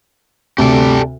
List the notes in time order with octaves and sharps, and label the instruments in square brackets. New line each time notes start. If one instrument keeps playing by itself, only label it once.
[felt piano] D2 C3 [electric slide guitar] G4 A4 D5